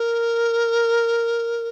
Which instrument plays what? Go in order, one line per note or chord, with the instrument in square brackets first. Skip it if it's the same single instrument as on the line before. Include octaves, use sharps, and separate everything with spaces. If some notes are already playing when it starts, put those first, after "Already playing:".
Already playing: [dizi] A#4